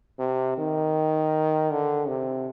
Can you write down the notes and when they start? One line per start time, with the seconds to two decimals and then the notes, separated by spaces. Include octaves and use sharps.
0.19 C3
0.58 D#3
1.71 D3
2.08 C3